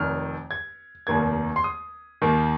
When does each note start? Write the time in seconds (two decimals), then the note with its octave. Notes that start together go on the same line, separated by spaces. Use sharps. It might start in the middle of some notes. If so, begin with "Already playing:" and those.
Already playing: F1 F2 D#3 F6
0.51 G#6
1.07 F1 D#2 D#3 A#3 G#6
1.56 C6
1.64 D#6
2.22 D#2 D#3 A#3